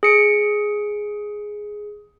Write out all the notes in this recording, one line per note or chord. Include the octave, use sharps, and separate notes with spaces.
G#4 C#7 D7